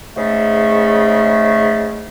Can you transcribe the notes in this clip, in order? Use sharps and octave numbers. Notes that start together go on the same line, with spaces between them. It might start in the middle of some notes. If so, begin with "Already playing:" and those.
G#2 C#3 A3